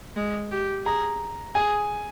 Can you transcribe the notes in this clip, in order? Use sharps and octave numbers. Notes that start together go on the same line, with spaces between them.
G#3
G4
G#4 A#5
G#4 G#5